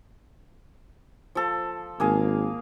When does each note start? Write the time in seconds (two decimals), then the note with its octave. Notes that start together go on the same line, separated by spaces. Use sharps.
1.35 F3 A4
2.00 G#1 A#3 G#4 F5